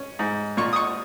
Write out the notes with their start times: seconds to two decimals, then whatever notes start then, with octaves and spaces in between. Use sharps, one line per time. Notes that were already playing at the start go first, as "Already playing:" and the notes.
Already playing: C#4
0.19 G#2
0.57 A#2 C#6
0.73 D#6
0.76 C#6